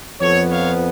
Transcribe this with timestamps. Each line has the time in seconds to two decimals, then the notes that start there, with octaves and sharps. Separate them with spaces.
0.21 F2 F3 B3 A4 C#5
0.50 C#5 F5